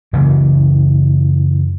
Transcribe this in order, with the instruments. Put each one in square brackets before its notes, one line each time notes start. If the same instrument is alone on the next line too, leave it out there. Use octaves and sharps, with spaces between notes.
[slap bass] F#2 C#3 E3 F#3